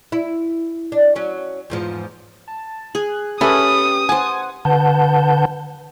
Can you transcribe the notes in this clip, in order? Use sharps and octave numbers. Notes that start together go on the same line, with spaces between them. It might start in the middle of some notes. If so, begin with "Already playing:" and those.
E4
D4
F#3 C#4
E2 G#2 F3
A5
G#4 F#6
C#4 G4 A4 B4 E5 B5 D#6
C5 F#5 G#5 A5
D3 B4 F#5 A5 G6